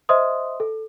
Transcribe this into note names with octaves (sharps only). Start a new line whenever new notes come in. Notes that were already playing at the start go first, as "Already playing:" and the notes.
C5 D#5 E5 C6 D#6
A4